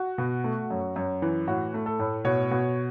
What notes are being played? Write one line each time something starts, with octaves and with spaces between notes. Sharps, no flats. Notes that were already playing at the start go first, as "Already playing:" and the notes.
Already playing: F#4
B2
A3
F#2
F#2
E3
A2 F#4
A3
A4
A2
B2 C#5
B2